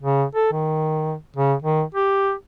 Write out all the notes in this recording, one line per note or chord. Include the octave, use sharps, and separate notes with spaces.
C#3
A4
D#3
C#3
D#3
G4